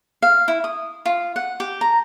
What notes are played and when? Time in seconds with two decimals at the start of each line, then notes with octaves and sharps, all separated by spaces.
0.22 F5
0.48 E4
0.64 D#6
1.06 F4
1.36 F#5
1.60 G4
1.81 A#5